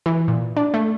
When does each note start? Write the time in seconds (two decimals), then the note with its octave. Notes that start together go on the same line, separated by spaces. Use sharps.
0.06 E3
0.28 A#2
0.57 D4
0.74 A3